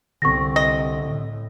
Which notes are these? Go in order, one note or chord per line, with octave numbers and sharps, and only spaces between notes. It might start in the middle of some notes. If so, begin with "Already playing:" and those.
C2 D3 C4 C#6 A#6
D#5 A#6
A2